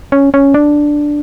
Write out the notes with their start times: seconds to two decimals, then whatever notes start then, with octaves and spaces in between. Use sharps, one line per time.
0.12 C#4
0.34 C#4
0.54 D4